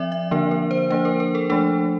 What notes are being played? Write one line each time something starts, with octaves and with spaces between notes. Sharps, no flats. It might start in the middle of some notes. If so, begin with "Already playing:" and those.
Already playing: F3 C4 D5 E5
E5
D3 F3 A#3 D4 A#4
A#4
C5
F3 A#3 D4 C5
A#4
A#4
A4
F3 A3 D4 A4